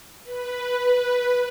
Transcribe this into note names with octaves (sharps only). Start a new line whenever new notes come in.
B4